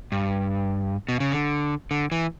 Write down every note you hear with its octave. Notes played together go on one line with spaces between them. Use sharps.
G2
B2
C#3
D3
D3
E3